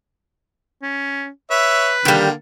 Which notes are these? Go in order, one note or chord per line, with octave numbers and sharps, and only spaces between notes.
C#4
B4 C#5 E5
D3 D#3 G3 A#3